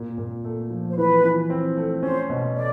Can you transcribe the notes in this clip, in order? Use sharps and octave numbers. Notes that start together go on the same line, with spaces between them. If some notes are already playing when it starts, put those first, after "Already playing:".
Already playing: A#2
A#2
A3
F3
C5
E3 B4
E3
C4
A3
C#4 C5
B2
A3 D5